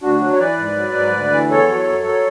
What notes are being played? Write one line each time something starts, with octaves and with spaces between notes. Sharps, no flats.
D2 D4 F#4
F#3
C#5
E3 B4 D5
G#2
F#3
G#2
D2
E3
E2 A4 C#5
F#3
F#2
F#3